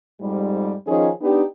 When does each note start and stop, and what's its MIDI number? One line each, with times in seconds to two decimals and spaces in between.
0.20 0.73 41
0.20 0.73 44
0.20 0.73 55
0.86 1.09 51
0.86 1.09 53
0.86 1.09 61
0.86 1.09 63
0.86 1.09 68
1.21 1.42 59
1.21 1.42 62
1.21 1.42 63
1.21 1.42 67